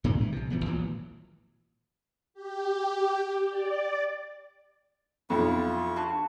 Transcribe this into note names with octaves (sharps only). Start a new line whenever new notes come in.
A2 D3 G#3 A3
E3
A#1 C3
D#1 E3 F3 B3
G#1 A#2 E3 F#3
G4
D5
B1 F2 E4 F4 C#6
D4 F#4 G4